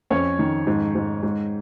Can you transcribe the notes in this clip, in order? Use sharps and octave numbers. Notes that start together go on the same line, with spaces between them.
F2 C#4 C#5
D#3
G#2
G#2
G#2